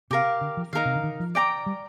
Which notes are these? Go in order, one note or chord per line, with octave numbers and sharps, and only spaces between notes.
C3 G4 A#4 F5
D3
F3
D#3 D#4 A#4 F5
C3
D3
D#3
F3
D5 G5 A#5 D6
G3